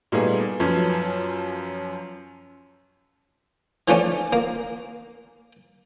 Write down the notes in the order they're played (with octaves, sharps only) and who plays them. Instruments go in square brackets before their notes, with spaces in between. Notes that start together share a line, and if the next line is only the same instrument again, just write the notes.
[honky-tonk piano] A#2 G3 A3 B3 D#4 G#4
F#2 F3 C#4 B4 A5 G#6
[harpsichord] E3 F3 A3 C#4 D4
A#3